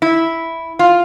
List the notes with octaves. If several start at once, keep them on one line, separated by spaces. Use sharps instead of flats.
E4
F4